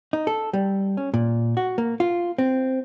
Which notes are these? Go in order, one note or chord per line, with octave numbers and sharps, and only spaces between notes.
D#4
A4
G3
C#4
A#2
F#4
A#3
F4
C4